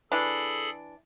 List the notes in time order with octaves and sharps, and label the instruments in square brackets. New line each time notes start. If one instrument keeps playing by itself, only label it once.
[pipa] E3 D4 [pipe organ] G#4 A4 B5